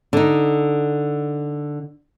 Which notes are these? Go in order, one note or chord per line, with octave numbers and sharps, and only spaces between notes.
D3 D#4